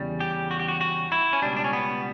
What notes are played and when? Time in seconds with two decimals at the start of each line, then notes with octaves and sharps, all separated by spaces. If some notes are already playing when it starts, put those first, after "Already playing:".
Already playing: E2 C#3 G3
0.20 G4
0.51 F#4
0.60 G4
0.68 F#4
0.81 F#4
1.12 E4
1.33 C#4
1.42 C#2 B2 G3 D4
1.57 D4
1.64 C#4
1.73 B3